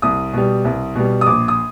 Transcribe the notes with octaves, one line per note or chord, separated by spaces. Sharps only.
C2 D#6
B2 G3
C2
B2 G3
D#6
A#1 D6
D#6